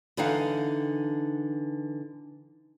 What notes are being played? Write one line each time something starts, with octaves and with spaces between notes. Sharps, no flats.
D3 E3 D#4 F5 F#5